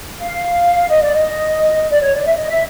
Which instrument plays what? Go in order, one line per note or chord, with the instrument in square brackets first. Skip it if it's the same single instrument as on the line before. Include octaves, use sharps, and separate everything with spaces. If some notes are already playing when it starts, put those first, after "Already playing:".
[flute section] F5
D#5
D5
D#5
D5
C#5
D5
E5
D#5
E5